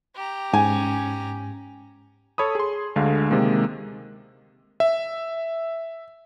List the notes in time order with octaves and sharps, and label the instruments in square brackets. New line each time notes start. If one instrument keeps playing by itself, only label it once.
[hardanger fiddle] G4 A#5
[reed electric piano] G#2 [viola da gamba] C#4 [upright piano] G#5
[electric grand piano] A4 C#5 B5 D#6
G#4 C6
D2 D3 G#3 F5
C3 D#3 G#3 A#3
E5